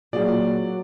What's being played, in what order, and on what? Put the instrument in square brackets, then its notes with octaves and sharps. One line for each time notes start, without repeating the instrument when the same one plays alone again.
[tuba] A#2 [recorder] F#3 [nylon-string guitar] F4 F#4 G#4 [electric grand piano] D5